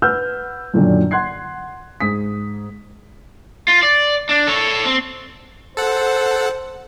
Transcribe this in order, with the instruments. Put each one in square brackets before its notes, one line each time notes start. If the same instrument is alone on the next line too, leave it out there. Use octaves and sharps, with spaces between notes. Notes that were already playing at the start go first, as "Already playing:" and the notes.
[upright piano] B4 F#5 E6 F6 G6
F#2 A#2 D3 D#3 F#3
F#5 C6 F#6 G#6 C7
G#2 D#6 B6
[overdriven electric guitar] F4
D5
D4
A4 C#5
C4
[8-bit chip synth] A4 F#5 [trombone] C5